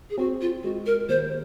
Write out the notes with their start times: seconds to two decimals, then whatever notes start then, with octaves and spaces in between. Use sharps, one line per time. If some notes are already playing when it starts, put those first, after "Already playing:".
0.10 G#4
0.18 C4 F#4
0.41 F4
0.63 G#3 F#4
0.86 A#4
1.09 D#2 C5